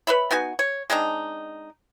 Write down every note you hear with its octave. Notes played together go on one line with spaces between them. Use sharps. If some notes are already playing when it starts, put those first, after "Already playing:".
B4 C#5 E5 B5
B3 D#4 F#4 G#5
C#5
G#3 C4 D4 D#4